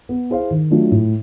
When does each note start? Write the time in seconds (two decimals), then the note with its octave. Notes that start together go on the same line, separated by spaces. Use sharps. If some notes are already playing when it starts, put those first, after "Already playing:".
0.09 B3
0.30 E4 G#4 C5 F5
0.51 D#3
0.70 F#3 A3 D4 F4
0.91 A2